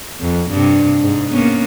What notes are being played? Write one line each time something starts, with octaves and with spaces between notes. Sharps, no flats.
F2
G2 C3
G#2
A#3 B3 C#4